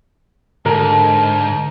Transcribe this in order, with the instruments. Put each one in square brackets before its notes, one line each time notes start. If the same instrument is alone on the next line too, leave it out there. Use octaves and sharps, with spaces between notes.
[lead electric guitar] G#2 [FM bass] D3 [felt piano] A#4 [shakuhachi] A5